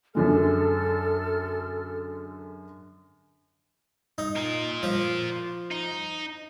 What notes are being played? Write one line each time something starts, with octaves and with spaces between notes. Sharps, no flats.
F#2 D3 G#3 A4 F6
D#4
F4 A#4
F3
D#4